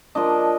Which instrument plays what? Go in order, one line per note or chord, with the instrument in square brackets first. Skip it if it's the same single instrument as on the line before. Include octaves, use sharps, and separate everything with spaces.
[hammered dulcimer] F3 A#3 D4 D#5